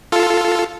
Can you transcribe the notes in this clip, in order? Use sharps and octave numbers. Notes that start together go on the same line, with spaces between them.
F4 A4